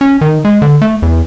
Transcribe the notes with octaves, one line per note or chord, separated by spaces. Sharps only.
C#4
D#3
G#3
D3
A3
E2